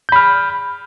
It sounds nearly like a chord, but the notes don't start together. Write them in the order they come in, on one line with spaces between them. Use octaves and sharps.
G6 B5 F6